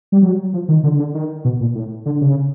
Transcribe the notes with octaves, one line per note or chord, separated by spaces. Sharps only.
G3
F#3
F3
D#3
D3
D3
D#3
B2
A#2
A2
D3
C#3